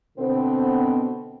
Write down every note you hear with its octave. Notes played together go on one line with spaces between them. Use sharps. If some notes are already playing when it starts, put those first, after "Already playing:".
B2 D3 B3 C4